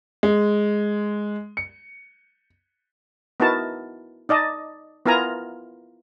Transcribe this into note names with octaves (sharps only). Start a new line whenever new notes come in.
G#3
C#7
B3 D#4 E4 F#4 A#4 A5
D#4 D5 D#5 A5
B3 E4 F4 A#4 G#5 A#5